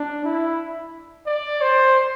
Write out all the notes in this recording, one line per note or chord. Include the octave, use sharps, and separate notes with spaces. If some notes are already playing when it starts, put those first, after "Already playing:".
Already playing: D4
E4
D5
C5